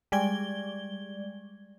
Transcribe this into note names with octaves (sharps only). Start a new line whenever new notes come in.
G3 G#3 D5 G#6 G7